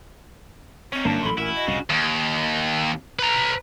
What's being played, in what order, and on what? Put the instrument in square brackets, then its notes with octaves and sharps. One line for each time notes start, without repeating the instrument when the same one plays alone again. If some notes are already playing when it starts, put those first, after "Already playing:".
[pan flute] C4 [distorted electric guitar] C#4 D#4
[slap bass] G1 [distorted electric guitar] F#2 [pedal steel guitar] A#3 D4 A5
[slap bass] A1 A#2 [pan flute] A4 [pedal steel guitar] B5 C6
[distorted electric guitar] E4 [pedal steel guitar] F#4 G#5 [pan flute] A#4
[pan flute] D#5
[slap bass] C2 F2 A2 [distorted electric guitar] C#3
[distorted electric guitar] D#2
B4 A#5